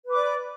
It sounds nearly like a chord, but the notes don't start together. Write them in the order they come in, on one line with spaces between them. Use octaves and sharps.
B4 D6 D5